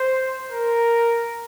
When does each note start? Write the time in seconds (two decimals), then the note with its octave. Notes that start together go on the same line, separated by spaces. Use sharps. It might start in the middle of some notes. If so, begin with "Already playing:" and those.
Already playing: C5
0.51 A#4